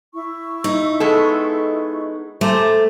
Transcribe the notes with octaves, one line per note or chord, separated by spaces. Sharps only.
E4 C#6
D#4
G#3 B3 A4
A3 C5 G#5 A#5 D6